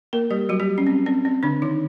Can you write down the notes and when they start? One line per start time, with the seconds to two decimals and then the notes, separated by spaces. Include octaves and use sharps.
0.13 A#3 A#4
0.31 G3 G4
0.49 F#3 F#4
0.60 G3 G4
0.78 C#4
0.87 C4
1.06 C4
1.25 C4
1.43 D3 D4
1.62 D#3 D#4